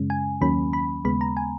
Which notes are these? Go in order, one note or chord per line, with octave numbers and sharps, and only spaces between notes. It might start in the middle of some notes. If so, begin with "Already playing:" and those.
Already playing: F#2 C#3 G#3 C#4
G#5
D#2 D#3 F#3 A#3 C#4 B5
B5
D#2 C#3 G#3 B3 B5
A#5
G#5